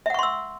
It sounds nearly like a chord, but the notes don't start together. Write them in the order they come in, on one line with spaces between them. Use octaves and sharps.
E5 F#5 C#6 C6 E6